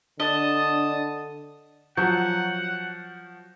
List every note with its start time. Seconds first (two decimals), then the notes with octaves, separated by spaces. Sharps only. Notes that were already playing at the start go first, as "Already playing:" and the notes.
0.20 D3 D4 D#5 A5 D#6
1.97 F3 F#3 F#4 F#5 G6